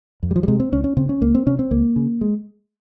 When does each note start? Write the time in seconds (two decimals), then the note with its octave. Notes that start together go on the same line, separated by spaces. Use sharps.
0.23 F2
0.31 G3
0.36 F3
0.43 G3
0.48 C3 G#3
0.60 C4
0.72 C#2 C#4
0.84 C#4
0.97 C#3 C4
1.09 C#4
1.21 C#2 A#3
1.35 C4
1.46 C3 C#4
1.59 C4
1.71 C#2 A#3
1.96 C#3
2.21 G#3